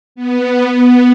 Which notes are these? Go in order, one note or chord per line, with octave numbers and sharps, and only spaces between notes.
B3
B3